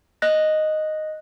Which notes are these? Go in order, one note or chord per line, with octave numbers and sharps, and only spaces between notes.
D#5 F#6 A#6